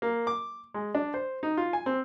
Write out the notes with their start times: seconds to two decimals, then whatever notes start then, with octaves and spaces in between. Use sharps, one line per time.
0.02 A#3
0.27 D6
0.74 G#3
0.95 D4
1.14 C5
1.43 D#4
1.57 F4
1.73 G#5
1.86 C4